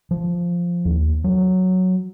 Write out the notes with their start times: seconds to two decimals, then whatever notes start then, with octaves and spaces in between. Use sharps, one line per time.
0.11 F3
0.85 D#2
1.24 F#3